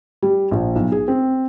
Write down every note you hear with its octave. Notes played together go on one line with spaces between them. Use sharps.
G3
A#1
B1
G#4
C4